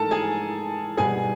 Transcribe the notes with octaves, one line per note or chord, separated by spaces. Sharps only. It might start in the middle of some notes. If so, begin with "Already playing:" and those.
Already playing: G#2 E3 A3 A4 A#4 A5
G#4 G#5
B2 G3 B3 G#4 G#5